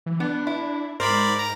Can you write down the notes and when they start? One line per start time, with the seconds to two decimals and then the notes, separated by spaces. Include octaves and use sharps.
0.06 E3
0.20 B3 D4
0.47 E4
1.00 G#2 A#4 C5 D5 B5
1.39 A#5